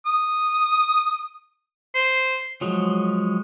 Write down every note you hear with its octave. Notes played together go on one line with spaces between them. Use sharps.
D#6
C5
F3 F#3 G#3